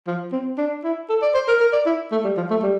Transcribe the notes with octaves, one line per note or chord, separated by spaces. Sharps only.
F3
C4
D4
E4
A4
D5
C5
A#4
A#4
D5
E4
A3
G3
F3
A3
G3